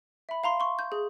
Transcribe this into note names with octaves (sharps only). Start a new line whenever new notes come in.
E5 B5
F5 A#5 C6
C6 C#6
G6
G#4